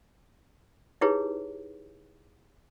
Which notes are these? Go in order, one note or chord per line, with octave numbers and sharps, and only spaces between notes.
D#4 E4 G4 G#4 B4 C#5